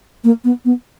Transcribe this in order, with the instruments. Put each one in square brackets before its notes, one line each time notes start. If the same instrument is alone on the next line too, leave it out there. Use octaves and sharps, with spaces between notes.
[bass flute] A#3
B3
B3